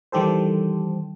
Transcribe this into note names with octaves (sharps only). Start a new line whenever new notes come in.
D#3 E3 G3 G4 A4 C5